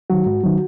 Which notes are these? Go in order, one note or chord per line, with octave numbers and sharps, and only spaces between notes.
D#3 F#3 F#4
G#2
D#3 F#3